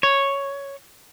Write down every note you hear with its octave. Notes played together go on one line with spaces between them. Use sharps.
C#5